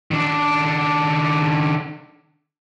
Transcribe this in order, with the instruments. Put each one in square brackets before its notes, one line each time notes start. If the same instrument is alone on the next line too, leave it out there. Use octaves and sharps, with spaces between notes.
[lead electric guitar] D#3 D4